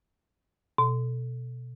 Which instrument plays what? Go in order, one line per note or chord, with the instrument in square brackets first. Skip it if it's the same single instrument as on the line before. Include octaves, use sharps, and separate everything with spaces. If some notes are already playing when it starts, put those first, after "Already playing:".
[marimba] B2